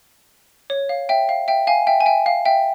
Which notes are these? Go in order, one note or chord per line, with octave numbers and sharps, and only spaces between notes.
C#5
F5
E5 G5
F5
E5 G5
F5 G#5
E5 G5
G#5
E5 G5
F5
E5 G5